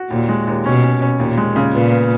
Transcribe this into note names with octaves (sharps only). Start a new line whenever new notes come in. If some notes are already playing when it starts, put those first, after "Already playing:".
Already playing: F#4
D#2 A#2
G#3
D#2
B2 C#4
C#4
C#4
D#2 A#2
G#3
C#3
A#2 B3
B3